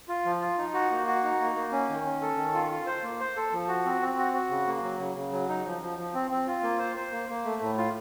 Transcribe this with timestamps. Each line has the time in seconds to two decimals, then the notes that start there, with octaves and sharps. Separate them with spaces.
0.08 F4
0.25 F3
0.41 F4
0.58 D#4
0.74 F#4
0.91 A#3
1.07 F#4
1.23 D#4
1.40 A#3
1.55 A#3
1.72 C#4
1.89 D#3
2.05 C#4
2.21 A4
2.37 D#3
2.54 F4
2.71 F4
2.86 C5
3.03 A#3
3.20 C5
3.36 A4
3.53 F3
3.68 F#4
3.85 C4
4.01 C4
4.18 F#4
4.34 F#4
4.50 C#3
4.67 A#3
4.83 F#3
5.00 C#3
5.16 C#3
5.32 F#3
5.49 D#4
5.66 F3
5.82 F3
5.98 F3
6.14 C4
6.31 C4
6.47 F4
6.63 A#3
6.79 C5
6.96 C5
7.12 A#3
7.29 A#3
7.45 A3
7.62 A2
7.77 F4